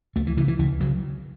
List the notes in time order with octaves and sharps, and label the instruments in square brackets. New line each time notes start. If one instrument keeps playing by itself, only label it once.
[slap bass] C#2 A3
E3
C#3 E3
E3
C#2 E3
C#3 F#3